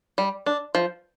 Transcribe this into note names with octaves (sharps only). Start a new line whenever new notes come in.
G3
D4
F3